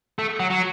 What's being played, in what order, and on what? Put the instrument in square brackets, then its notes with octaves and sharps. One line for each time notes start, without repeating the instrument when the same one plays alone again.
[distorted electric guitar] A3
F#3
F#3